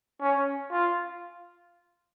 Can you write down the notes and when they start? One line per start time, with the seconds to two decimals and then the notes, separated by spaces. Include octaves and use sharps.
0.21 C#4
0.71 F4